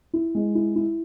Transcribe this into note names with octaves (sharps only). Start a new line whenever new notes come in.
E4
G#3
E4
E4